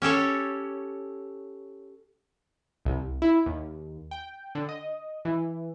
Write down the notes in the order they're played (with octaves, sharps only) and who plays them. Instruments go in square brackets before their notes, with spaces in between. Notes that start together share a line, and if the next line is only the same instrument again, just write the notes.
[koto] C#4 G4 A4 C#5
[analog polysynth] C2
E4
D#2
G5
D3
D#5
E3